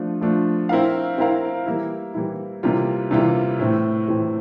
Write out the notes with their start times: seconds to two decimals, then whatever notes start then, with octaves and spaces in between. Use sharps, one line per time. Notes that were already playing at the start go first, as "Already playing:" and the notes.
Already playing: F3 A3 D4 F4
0.21 F3 A3 D4 F4
0.69 C4 E4 A#4 F5
1.18 C4 E4 A#4 F5
1.66 E3 G3 A#3 E4
2.14 E3 G3 A#3 E4
2.63 C3 E3 G3 A#3 F4
3.11 C3 E3 G3 A#3 F4
3.59 A2 E3 A3 C4
4.08 A2 E3 A3 C4